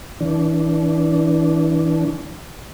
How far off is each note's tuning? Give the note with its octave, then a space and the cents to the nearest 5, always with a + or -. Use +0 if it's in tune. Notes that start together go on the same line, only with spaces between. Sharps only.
E3 -25 D4 -20